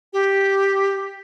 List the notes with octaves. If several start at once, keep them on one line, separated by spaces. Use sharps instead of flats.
G4